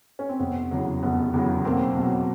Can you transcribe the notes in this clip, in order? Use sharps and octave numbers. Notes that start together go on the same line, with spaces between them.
C#4
C4
F1 B3
E2 C#3 F#3
F1 B3
E2 C#3 F#3
B1 A#3 C4
B2 F#3